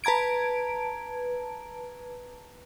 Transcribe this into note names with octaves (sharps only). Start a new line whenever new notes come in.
B4 A5 A#5 G#6 D7